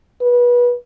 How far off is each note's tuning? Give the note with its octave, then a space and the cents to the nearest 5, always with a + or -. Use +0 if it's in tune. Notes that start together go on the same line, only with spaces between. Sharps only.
B4 -25